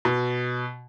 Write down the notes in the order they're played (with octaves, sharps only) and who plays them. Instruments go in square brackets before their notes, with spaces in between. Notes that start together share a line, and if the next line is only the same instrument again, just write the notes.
[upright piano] B2